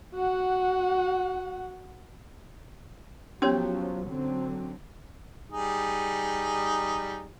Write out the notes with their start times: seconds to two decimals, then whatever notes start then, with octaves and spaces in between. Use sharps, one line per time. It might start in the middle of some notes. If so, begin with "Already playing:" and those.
0.15 F#4 F#5
3.42 F3 F#3 B3 C#4 G4 C#5 C6
4.07 D3 F#3 C4
5.51 G3 D#4 G#4